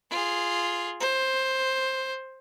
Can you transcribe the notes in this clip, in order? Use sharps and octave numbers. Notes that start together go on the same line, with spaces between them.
F4 G#4
C5